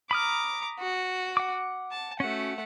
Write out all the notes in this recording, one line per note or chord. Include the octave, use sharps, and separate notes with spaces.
A#5 B5 D6 D#6 F6
F#4
F#5 D6
A5
A3 C#4 F#4 F#5